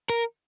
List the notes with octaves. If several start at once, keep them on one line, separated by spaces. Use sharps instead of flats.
A#4